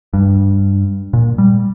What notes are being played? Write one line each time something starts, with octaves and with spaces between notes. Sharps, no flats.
G2
A#2
G3